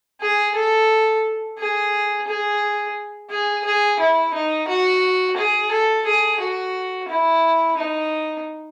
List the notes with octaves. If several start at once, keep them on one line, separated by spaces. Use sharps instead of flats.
G#4
A4
G#4
G#4
G#4
G#4
E4
D#4
F#4
G#4
A4
G#4
F#4
E4
D#4